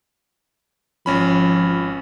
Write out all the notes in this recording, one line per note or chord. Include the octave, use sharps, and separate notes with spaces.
G#1 F3 C#4 B5